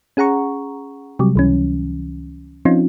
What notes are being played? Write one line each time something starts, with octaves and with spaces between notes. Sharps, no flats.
C#4 G#4 F#5 A#5 C#6
C3 F#3 G3
C#2 E3 C#4
F3 C4 C#4 D#4 F4